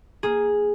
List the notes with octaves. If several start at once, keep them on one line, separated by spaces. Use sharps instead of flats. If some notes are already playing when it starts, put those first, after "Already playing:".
A#3 G#4